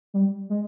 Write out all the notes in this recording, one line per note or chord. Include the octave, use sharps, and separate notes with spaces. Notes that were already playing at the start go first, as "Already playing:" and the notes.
G3
G#3